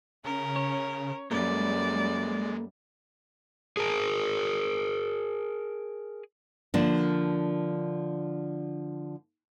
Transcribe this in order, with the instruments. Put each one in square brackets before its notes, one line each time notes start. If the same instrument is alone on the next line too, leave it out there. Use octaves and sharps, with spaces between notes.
[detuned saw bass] C#3 [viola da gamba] C#4 [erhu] A#4
[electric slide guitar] C#5
[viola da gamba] F#2 G3 [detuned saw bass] G#3 [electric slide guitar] A#3 A4 B4 [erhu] D5
[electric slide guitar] G#4 A#4
[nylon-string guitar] D3 F3 A#3 D4